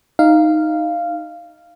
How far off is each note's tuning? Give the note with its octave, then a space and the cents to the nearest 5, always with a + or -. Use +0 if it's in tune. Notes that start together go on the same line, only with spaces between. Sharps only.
D#4 +0 F5 -10